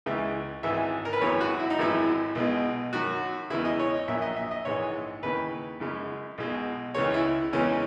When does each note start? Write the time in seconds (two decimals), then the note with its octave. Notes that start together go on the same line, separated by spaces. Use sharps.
0.06 C#2 C#3 E3 G#3 E5
0.63 G#1 G#2 E3 G#3 E5
1.05 A#4
1.13 B4
1.21 G#1 F#2 E3 G#3 C#5
1.41 F#4
1.59 E4
1.70 D#4
1.78 G#1 F#2 E3 G#3 E4
2.35 B1 B2 G#3
2.93 F#2 D#3 F#3 F#4
3.50 E2 C#3 E3 G#3 E4
3.65 D#5
3.79 C#5
3.94 D#5
4.08 A#1 A#2 F#3 E5
4.22 D#5
4.36 E5
4.51 D#5
4.65 A#1 G#2 E3 G#3 C#5
5.23 D#2 C#3 E3 B4
5.80 F#2 C#3 G#3
6.38 B1 B2 G#3
6.94 C#2 C#3 E3 G#3 C#5
7.14 E4
7.53 E2 C#3 E3 G#3 C#4